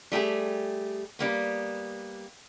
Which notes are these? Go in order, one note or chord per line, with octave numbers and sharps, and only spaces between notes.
G3 A3 G4 G#4
G3 A#3 B3